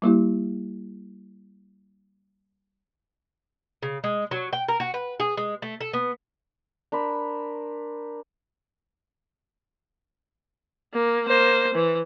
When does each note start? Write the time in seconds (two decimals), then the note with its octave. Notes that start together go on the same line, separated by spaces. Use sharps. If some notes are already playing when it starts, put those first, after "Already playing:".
0.02 G3 A#3 E4 G4
3.82 C#3
4.04 G#3
4.31 F#3
4.53 G5
4.68 A#4
4.80 F#4
4.94 B4
5.20 G#4
5.37 G#3
5.62 A3
5.81 A4
5.93 B3
6.92 D4 A#4 C5 B5
10.94 A#3
11.28 A#3 C5
11.75 E3